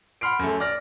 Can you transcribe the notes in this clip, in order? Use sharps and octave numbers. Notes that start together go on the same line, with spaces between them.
F#5 B5 C6 F6 C7 D7
F#2 A3
D5 F6 A#6